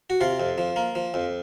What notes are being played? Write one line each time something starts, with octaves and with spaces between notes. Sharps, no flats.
F#4
C3 F4
F2
F3
A#3
F3
F2